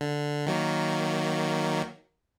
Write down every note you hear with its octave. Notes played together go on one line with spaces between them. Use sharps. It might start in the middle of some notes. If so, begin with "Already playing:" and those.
D3
D#3 F#3 A#3